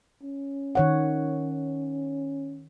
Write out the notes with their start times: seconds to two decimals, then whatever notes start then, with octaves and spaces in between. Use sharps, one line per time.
0.23 C#4
0.75 D#3 C#5 F#5